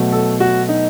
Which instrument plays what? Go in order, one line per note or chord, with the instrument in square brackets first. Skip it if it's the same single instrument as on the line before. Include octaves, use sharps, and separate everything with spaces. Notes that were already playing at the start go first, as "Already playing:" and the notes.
Already playing: [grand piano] B2 F#3 A3
A4
F#4
D#4